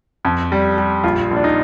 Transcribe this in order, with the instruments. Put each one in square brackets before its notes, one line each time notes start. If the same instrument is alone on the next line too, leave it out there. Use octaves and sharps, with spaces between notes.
[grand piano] F2
G3
G3
A#1 F4
A#1
D4
D#4